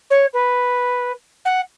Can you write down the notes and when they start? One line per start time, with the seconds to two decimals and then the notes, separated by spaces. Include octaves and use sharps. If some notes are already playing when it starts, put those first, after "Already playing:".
0.10 C#5
0.33 B4
1.45 F#5